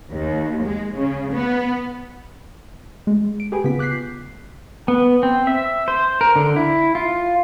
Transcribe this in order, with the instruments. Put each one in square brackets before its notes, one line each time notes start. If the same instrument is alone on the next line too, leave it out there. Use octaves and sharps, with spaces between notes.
[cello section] D#2
G#3
C#3
B3
[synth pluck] G#3
D7
G4 G#4 B4 G#5
C#3 B3 F4 B6
D6 F#6 G6 B6 C7
[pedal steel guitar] B3
C4
E5
C5
A#4
D3
E4
F4